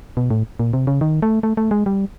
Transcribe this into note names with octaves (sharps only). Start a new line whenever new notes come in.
B2
A2
A#2
C3
C#3
D#3
A3
A3
A3
G#3
G3